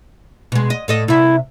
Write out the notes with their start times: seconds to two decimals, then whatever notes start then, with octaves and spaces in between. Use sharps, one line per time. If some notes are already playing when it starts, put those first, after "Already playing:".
0.52 B2 G#3
0.70 D#5
0.88 A2 A4 D#5
1.08 C3 E4 E5